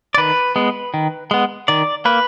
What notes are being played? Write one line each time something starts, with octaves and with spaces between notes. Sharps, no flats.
D5
D#3 B4
G#3 B3
D#3
G#3 B3
D#3 D5
A#3 B4